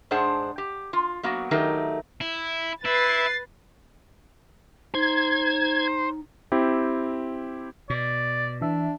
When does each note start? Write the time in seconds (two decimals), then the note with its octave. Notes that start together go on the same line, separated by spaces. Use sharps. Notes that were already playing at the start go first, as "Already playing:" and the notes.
0.11 G#2 D4 G#4 C5 F#5 A5
0.58 G4
0.93 F4
1.23 F#3 A#3 B3 F#4
1.51 D#3 F#3 A3 D#4 G4 A#4
2.21 E4
2.85 E4 B4 A6 C7
4.95 D#4 C5 G#6
6.52 C4 E4 G4
7.90 B2 D5
8.62 E3 D4 E5